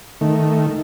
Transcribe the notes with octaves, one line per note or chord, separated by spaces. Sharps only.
D#3 A3